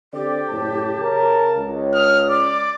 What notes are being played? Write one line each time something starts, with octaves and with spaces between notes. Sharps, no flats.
D3 C4 G4 D5
F#1 A2 A5
C#3 A#4
C#2
D#6 F6
D5 D6